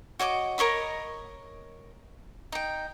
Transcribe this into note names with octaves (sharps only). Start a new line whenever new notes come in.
F#4 C#5 D#5 D6
A#4 C#5 D#5 B5
D#4 G5